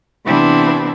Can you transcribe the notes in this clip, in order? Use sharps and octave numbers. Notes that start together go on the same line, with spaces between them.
C3 E3 B3 C4 D4 E4